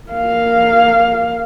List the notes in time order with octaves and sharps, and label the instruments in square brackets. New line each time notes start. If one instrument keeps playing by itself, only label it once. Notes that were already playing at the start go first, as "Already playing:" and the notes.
[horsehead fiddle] A#3 F5